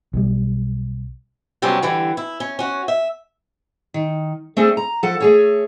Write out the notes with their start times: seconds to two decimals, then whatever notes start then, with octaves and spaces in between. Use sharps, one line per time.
0.13 B1 G3
1.62 C3 F#3 G3 B3 C#4
1.82 D3 E3 G3
2.17 E4
2.40 C#4
2.59 C#4 F#4
2.88 E5
3.94 D#3
4.57 A3 C4 D4 G#4 A4 C5
4.77 A#5
5.03 F3 A4 F#5
5.20 A3 G#4 C#5